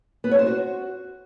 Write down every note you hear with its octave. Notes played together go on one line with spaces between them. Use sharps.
B3
C#5
C5
F#4